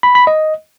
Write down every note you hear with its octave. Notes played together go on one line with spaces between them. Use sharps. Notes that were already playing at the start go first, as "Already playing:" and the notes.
B5
B5
D#5